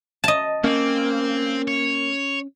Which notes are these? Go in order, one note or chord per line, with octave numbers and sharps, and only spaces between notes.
D#5 A5
A#3 C4 C#4
C#5